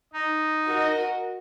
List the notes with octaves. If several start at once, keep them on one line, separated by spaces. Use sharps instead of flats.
D#4
F#4 A#4 D#5